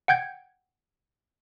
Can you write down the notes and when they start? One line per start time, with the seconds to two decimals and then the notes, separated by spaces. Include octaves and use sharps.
0.08 F#5 G5 G6 G#6